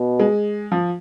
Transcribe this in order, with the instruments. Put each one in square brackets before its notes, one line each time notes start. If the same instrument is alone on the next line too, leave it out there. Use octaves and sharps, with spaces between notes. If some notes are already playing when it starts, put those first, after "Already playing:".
Already playing: [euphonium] B2
[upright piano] G#3
F3